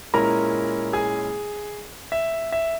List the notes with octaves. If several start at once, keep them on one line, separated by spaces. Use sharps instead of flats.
A#2 G#3 C#4 E4 A#4 A#5
G#4 G#5
E5
E5